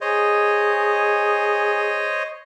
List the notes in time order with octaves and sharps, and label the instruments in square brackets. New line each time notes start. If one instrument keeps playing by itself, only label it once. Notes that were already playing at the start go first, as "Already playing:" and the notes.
[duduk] G#4 [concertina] C5 C#5 D#5